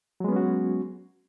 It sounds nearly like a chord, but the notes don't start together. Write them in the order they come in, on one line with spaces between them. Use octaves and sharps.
F#3 G#3 B3 C#4 F#4